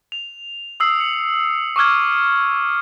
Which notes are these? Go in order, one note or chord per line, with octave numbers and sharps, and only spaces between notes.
F7
D#6 E6 C7
C#7
C#6 D6 E6 F6 G#6